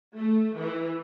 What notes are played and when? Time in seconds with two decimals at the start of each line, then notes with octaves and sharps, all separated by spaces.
0.16 A3
0.59 E3